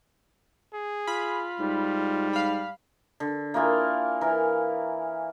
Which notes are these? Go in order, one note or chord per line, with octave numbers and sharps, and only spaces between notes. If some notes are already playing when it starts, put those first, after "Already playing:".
G#4
F4 B5
G#2 G3
F5 B5
D3
A#3 E4 F4 G#4
E3 A#4